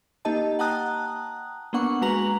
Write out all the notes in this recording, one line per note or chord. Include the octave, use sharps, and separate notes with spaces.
A#3 D#4 G4 D#5 A5
F#5 G5 A5 A#5 D#6 F#6
A#3 B3 D4 F#5 C#6
G#3 F#4 B4 A#5 F7 F#7